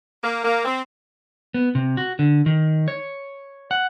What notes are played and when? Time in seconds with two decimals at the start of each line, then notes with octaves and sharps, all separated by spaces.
0.23 A#3
0.44 A#3
0.64 C4
1.54 B3
1.75 C3
1.97 F#4
2.19 D3
2.46 D#3
2.88 C#5
3.71 F#5